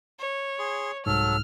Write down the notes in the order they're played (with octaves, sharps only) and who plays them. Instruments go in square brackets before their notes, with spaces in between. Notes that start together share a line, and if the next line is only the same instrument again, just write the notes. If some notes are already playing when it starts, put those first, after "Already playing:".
[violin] C#5
[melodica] G#4 C6
[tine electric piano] C2 G#2 [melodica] F#3 A4 [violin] F6